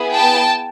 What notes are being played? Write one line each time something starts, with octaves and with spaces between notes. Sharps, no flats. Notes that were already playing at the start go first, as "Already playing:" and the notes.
Already playing: B3 E4 G#4
G5 A5